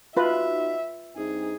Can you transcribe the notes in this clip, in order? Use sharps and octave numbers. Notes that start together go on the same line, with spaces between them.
D#4 F4 F#4 B4 E5
G2 C4 D#4 G#4